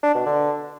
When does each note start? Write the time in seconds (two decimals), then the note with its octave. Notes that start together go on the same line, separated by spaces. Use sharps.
0.03 D4
0.15 B2
0.26 D3